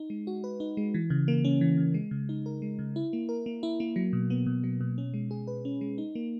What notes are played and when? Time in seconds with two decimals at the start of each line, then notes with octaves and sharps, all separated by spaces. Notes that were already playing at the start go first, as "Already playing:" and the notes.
Already playing: D#4
0.10 G#3
0.27 F#4
0.44 B4
0.60 D#4
0.77 G#3
0.94 E3
1.10 C#3
1.28 A#3
1.45 C#4
1.61 E3
1.78 C#3
1.94 G#3
2.11 C#3
2.29 D#4
2.46 A#4
2.62 G#3
2.79 C#3
2.96 E4
3.13 A#3
3.29 A#4
3.46 A#3
3.63 E4
3.80 A#3
3.96 F#3
4.13 B2
4.30 B3
4.46 B2
4.64 F#3
4.81 B2
4.98 C#4
5.14 G#3
5.31 G#4
5.47 B4
5.65 C#4
5.81 G#3
5.98 D#4
6.15 A#3